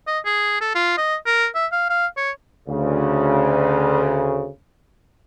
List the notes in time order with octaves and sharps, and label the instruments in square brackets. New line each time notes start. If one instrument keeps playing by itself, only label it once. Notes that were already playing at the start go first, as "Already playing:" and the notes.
[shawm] D#5
G#4
A4
F4
D#5
A#4
E5
F5
F5
C#5
[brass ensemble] D2 C#3